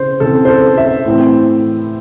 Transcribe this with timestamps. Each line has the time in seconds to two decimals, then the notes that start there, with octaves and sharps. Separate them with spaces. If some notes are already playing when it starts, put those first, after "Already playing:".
Already playing: C#3 E3 C5
0.20 C#3 E3 C4 A4
0.45 C5
0.49 A4
0.78 E5
1.05 A2 E3 C4